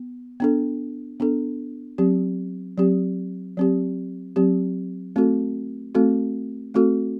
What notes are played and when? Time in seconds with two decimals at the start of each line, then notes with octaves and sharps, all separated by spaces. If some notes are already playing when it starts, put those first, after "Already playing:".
Already playing: B3
0.40 B3 D4 A4
1.20 B3 D4 A4
1.98 F#3 C4 G4
2.78 F#3 C4 G4
3.57 F#3 C4 G4
4.36 F#3 C4 G4
5.16 A3 C4 F#4 A4
5.95 A3 C4 F#4 A4
6.74 A3 C4 F#4 A4